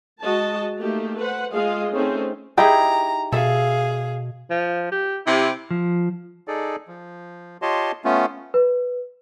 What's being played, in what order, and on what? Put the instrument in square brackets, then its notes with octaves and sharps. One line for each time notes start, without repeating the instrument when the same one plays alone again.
[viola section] G#3 F#4 D#5 A5
A3 A#3 D#4 G4
B4 C5 F#5
G#3 F4 G#4 D#5 F5
A3 C4 C#4 D#4 G#4 C5
[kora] D#4 E4 G#4 [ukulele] G4 [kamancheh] A#5
[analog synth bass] B2 [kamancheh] G#4 F5 [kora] A4 E5
[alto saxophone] F3
G4
[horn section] C3 [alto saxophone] E4
[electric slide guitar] F3
[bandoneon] D#4 G#4 A4 D5
F3
F4 G4 C#5 D#5 A5 C6
A3 B3 C#4 F4
[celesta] B4